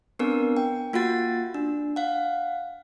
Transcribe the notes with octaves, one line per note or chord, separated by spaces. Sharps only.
B3 C4 D4 A#4
G5
A#3 F4 F#4 F#5 A6
D4
F5 F#5